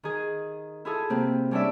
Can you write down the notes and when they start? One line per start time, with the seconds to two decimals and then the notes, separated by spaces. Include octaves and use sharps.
0.03 D#3 G#4
0.85 E4 F4 G#4 A4
1.10 C3 A#3 C4
1.51 G3 C#4 D4 E4 D5 E5